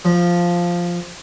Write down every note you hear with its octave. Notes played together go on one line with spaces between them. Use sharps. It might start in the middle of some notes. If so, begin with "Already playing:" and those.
F3